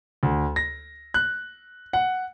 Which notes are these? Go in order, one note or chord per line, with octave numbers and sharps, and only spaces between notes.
D2
A#6
F#6
F#5